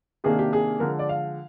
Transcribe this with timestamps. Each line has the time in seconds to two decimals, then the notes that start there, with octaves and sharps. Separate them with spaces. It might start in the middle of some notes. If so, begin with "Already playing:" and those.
0.24 C3 D#3 A#3 D4 G#4
0.39 G4
0.53 G#4
0.80 D3 F3 G#3 A#4
0.99 D5
1.09 F5